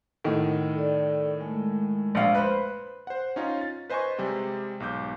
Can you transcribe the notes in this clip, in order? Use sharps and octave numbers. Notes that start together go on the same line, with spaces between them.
A2 D#3 F#5
A4 D5
G#3 A3
A#1 F5
B4 C5
C5 F#5
C#4 D#4 F4
A6
B4 C5 D#5 G#5 C6 C#6
C3 G3 G#3
B1 G#2 D6 G6